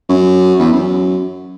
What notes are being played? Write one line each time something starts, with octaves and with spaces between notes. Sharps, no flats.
F#2
E2
F#2